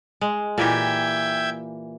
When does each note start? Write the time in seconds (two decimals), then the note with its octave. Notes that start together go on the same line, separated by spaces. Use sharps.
0.21 G#3
0.58 A#2 E3 G4 E5 G5 G#6